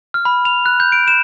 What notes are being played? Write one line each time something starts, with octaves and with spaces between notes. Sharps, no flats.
F6
B5
F7
F#6
G6
D7
E7